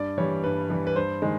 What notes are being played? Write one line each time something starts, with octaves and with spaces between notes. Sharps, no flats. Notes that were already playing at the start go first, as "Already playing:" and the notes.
Already playing: G2 D5
E3 G3 C#5
G2 B4
E3 G3
B4
G2 C5
D#3 G#3